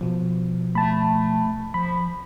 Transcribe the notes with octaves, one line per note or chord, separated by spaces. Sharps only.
B2 F3
A3 A5 B5
F3 B5